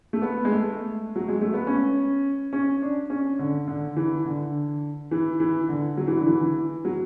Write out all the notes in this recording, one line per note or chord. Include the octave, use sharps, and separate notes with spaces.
A3
B3
G#3
A3
F#3
G#3
A3
B3
C#4
C#4
D4
C#4
D3
D3
E3
D3
E3
E3
D3
F#3
E3
D3
E3
E3
F#3